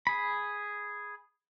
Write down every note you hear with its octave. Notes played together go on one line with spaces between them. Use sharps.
G#4 B5